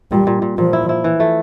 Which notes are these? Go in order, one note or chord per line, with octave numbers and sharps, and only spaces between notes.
A#2 G3
A#2
A#2
A#2 F3
E4
E4
E3
A3